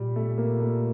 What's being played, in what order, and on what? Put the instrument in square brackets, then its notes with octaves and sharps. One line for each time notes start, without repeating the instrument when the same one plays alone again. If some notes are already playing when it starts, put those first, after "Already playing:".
Already playing: [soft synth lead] A#2 [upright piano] G3
[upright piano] A3
A#3
A3